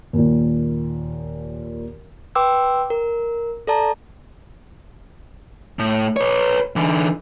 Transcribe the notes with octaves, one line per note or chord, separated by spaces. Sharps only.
D#2 A#2
B4 G5 C6 D6 E6
A#4
A4 D5 A5 A#5
A2
B4 C#5
D3 E3